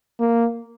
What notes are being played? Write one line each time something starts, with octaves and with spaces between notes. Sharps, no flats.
A#3